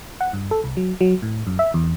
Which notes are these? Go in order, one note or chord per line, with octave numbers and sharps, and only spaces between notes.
F#5
G2
A4
C2
F#3
F#3
A2
F#2
E5
E2